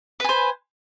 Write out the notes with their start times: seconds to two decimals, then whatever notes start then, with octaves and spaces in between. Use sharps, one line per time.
0.20 B4
0.24 G#5
0.29 C5